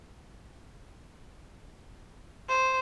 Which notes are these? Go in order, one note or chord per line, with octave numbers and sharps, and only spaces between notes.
C5